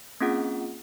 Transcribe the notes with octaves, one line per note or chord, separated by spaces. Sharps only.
A#3 C4 C#4 F4 G#4 F#5